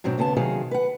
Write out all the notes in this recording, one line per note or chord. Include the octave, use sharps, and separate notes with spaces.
G#2 B2 F#3 C4 D4
D#2 C#3 B3 G#5 A5
C3 D#3 F#3 G#4 F5
B4 F#5